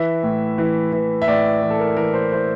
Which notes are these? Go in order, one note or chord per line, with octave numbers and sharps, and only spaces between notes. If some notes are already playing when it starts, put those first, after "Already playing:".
Already playing: E3 E5
A2
E3
E3
E5
A2 D5
E3
A4
A#4
E3 A#4
C5
E3 C5